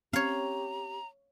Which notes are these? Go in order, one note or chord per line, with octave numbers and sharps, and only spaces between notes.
C4 C#4 G4 C#5 F5 A#5